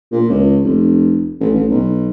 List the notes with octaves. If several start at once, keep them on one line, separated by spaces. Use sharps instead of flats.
A#2
C#2
F1
A1
A1
B1